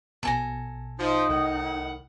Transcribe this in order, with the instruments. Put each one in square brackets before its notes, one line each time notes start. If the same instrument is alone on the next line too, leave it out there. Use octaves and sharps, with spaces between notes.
[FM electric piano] A#1 B2 [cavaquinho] A4 G#5 A#5
[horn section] F3 [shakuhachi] D#4
[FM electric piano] C2 [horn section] A2 D#3 F#5